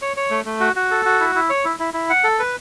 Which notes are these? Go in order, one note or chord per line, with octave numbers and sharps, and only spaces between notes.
C#5
C#5
A3
A3
F#4
F#4
A4
F#4
E4
E4
C#5
E4
E4
E4
F#5
A4
B4